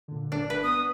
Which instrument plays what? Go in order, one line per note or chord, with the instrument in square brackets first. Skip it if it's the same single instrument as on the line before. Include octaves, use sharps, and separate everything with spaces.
[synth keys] A#2 D3
[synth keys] G1 [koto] D4
[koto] B4
[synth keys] B3 D#7 [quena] D#6